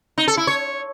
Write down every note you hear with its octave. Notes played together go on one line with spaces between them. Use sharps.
D#4
A4
E4
C#5